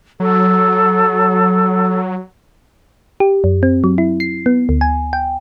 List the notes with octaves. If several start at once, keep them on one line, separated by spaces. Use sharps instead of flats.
F#3 A4
G4
F#2
C4
F#3
E4
C7
B3
D2
G#5
G5